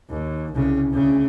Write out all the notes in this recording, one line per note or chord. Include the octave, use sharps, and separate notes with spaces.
D#2
C2 C#3
D2 C#3